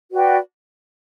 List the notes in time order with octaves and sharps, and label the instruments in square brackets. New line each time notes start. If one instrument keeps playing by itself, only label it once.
[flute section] F#4 B4 D5 G5